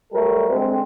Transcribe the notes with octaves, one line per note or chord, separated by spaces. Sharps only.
F#3 G3 A3 A4 A#4
D3 G#3 C4